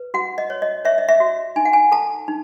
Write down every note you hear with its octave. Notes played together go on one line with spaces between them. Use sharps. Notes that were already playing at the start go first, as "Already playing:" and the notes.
Already playing: B4
F#4 F#5
D#5
C#5
D#5
C#5 E5
D#5
E5
F#4
D#4 G#5
F#5
G#5
A4 A5
D#4